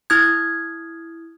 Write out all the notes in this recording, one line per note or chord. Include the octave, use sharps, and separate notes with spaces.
E4 D#6 F6 G#6